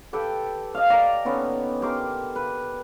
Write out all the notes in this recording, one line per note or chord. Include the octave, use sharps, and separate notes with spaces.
G4 A4 B4 G5
D#5 F5
D5 A#5
D3 B3 C#4 D#4
G4 A#4 C6 D6
B4